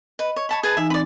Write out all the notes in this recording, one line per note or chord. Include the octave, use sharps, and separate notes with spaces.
B4 D#5
C#5
C#5 A5 B5
G#4 B4 A5
E3 D#4 E5 G#5
C4 D5 B5